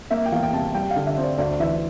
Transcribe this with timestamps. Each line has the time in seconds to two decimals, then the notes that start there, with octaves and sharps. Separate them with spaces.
0.10 A#3 E5
0.26 G5
0.32 E2 F5
0.43 G5
0.53 C3 A5
0.75 G3 G5
0.91 F5
0.96 D3
1.06 E5
1.18 C4
1.23 D5
1.38 D2 D5
1.60 E3 E5